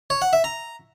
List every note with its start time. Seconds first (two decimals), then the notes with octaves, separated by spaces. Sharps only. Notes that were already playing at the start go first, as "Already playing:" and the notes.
0.10 C#5
0.22 F#5
0.33 E5
0.44 A#5